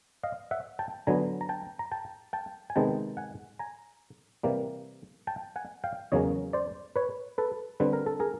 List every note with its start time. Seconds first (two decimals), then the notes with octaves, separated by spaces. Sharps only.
0.23 D#5 F5
0.51 E5 F#5
0.79 G5 A5
1.07 D3 F#3 B3 G#5 A#5
1.41 A#5
1.49 G5 A5
1.79 A#5
1.92 G5 A5
2.33 G5 A5
2.70 G#5
2.76 C3 D#3 G#3 B3 D#4 G5 A5
3.17 F#5 G#5
3.59 G#5 A#5
4.43 C3 E3 G3 A#3
5.27 G5 A5
5.56 F#5 G#5
5.84 F5 G5
6.12 E2 C#3 F#3 A#3 C#4 C#5 D#5
6.53 C5 D5
6.96 B4 C#5
7.38 A4 B4
7.80 D3 G3 C4 B4
7.93 A#4
8.06 A4
8.20 G#4 A#4